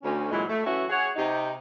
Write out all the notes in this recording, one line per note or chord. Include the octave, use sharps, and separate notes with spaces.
D2 C#4
F2 A#2 E3 F#3 G#3 E4
A3
E3 F#3 C#4 F#4 E5
G#4 C#5 F#5
C3 D#4